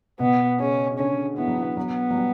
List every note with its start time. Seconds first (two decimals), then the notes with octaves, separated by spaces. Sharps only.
0.20 B2 B3
0.60 C#3 C#4
0.92 C#3
0.99 D3 C#4
1.37 E3 B3
1.48 F#3
1.57 E3
1.77 F#3 B3
2.11 F#3
2.16 G3